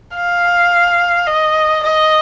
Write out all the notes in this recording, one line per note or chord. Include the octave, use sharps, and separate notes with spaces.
F5
D#5
D#5